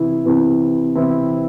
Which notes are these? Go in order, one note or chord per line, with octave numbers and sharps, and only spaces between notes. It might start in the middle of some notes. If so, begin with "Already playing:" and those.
Already playing: C3 E3 C4 E4
C3 E3 C4 E4
C3 E3 C4 E4